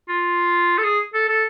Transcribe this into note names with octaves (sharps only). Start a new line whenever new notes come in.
F4
A4
G#4
A4
A4